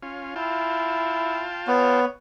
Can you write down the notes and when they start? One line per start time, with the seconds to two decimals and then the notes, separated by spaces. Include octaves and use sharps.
0.02 C#4 F4
0.36 E4 F4 G5 A5
1.67 B3 C#5